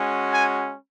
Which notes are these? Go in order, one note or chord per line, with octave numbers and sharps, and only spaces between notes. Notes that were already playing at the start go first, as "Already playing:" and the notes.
Already playing: G#3 C#4 F#4
G#5